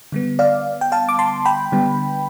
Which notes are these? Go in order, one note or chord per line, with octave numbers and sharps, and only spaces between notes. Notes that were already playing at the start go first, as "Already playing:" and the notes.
D3 G3 B3
D5 F5
G5
F5 A5
D6
A5 C6
G5 B5
D3 G3 B3